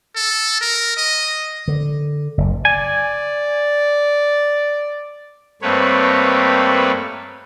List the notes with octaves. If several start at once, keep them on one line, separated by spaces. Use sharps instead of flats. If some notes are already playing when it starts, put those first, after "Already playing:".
A4
A#4
D#5
D3
F#1
D5 G#5
G2 A3 A#3 C4 B4 C#5